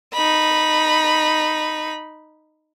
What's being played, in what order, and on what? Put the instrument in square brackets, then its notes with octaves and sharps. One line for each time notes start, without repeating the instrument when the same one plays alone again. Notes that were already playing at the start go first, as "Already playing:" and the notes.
[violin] D#4 B5